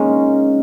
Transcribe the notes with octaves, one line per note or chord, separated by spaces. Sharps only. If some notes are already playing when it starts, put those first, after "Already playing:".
Already playing: G#3 A#3 C#4 D#4 G#4